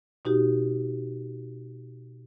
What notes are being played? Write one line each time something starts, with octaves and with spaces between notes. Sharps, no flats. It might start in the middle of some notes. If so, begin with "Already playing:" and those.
B2 D#4 F#4 G4